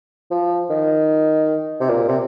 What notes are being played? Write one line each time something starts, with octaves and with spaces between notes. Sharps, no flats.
F3
D#3
C3
A#2
C3